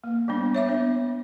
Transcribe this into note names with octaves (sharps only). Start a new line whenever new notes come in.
A#3
G3 B3 D4
C#5 E5 D6
B3 D4